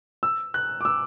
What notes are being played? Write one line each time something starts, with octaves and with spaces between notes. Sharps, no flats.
E6
F#6
D6
E6